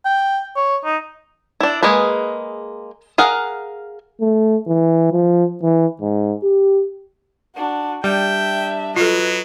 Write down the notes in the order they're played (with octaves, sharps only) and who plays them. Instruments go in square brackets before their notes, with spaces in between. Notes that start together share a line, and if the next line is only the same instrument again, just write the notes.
[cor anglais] G5
C#5
D#4
[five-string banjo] D4 E4
G#3 A#3 G#4 B4
G#4 A#4 F5 F#5
[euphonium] A3
E3
F3
E3
G#2
G4
[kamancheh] D4 F#4
[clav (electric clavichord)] G3 [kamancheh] D4 E5 [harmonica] G5
[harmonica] F#3 [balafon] F4 A4 [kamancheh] B4 D#5